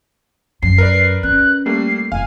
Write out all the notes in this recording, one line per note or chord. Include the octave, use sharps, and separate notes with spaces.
F#2 C7
A#4 B4 D5
C#4 F#6
G3 A3 A#3 C7
F1 F5 G#5